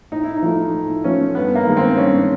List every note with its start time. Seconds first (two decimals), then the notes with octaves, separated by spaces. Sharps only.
0.12 A2 D#4
0.24 E4
0.37 D#4
0.42 F3 A3
0.73 A2
1.04 F3 A3 C#4
1.35 G2 B3
1.55 A#3
1.66 D#3 G#3
1.77 C4
1.97 G2 C#4